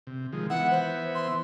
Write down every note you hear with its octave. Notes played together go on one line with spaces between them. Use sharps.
C3
D#3 F3 G#3
E3 B3 E5 F#5
C5
C6